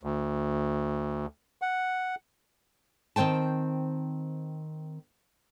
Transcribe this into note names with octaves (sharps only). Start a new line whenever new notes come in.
D2
F#5
D#3 C4 C5 G5 A5